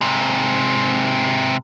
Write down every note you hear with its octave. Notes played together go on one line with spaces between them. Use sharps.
G#2 C3